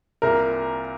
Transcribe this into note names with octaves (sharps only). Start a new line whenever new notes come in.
C2 A#2 A#4